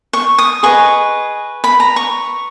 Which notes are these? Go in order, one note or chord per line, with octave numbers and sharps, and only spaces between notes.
C#6
D#6
G#4 B4 D#5 C#6
B5
A#5
C#6